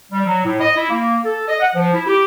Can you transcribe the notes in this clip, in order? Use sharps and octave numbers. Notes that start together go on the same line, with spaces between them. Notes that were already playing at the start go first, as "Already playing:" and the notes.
G3
F#3
A2
D#5
E4
A#3
A4
D#5
F#5
F3
E4
G4